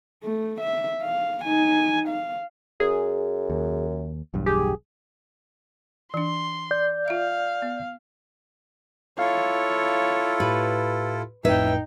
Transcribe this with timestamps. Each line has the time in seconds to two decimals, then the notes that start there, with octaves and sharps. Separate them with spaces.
0.23 A3
0.61 E5
1.02 F5
1.44 D#4 G#5
2.08 F5
2.80 F#2 G#4
3.50 D#2
4.34 B1 E2 G2
4.46 G4 G#4
6.14 E3 D4 C6
6.71 D5 G6
7.08 F4 E5 F5
7.62 B3
9.19 E4 F4 A4 C#5 F5
10.40 A2 G4 B4
11.45 G#1 F2 A2 D#4 B4 C#5 E5 G5